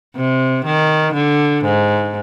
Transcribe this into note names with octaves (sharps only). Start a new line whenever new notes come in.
C3
D#3
D3
G#2